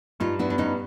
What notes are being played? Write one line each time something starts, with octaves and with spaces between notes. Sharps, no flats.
G2 D#4 F4
B3 D4 E4
D4
G2 C#4 D#4